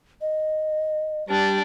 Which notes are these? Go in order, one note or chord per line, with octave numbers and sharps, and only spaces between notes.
D#5
G3 D4 D5